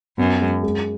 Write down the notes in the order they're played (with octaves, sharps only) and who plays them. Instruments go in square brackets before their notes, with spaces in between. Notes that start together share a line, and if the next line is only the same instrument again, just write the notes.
[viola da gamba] F#2 [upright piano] B3
[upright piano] G#3
G#3